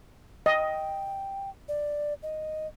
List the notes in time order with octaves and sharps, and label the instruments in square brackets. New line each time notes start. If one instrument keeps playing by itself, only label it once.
[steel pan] D#5 [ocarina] G5
[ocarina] D5
D#5